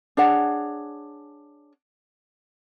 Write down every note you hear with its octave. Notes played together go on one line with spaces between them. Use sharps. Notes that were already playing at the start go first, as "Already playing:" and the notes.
D4 G#4 C#5 F#5